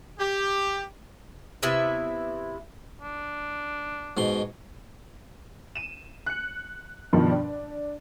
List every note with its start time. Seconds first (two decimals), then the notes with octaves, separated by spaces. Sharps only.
0.19 G4
1.63 C3 B3 E4 E5
3.01 D4
4.17 G#2 B2 C6
5.75 D#7 E7
6.26 F#6 C#7
7.13 G2 B2 D#3 F3
7.30 D4